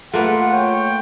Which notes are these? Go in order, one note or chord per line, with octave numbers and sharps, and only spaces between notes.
A3 A#3 F4 B4 F#5
C#5 G5